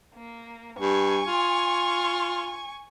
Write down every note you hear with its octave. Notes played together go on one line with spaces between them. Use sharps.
A#3
G2 G#5 C#6
F4